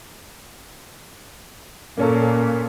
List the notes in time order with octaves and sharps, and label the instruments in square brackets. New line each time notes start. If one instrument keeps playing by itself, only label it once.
[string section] A#2 [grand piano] A#3 C#4 A4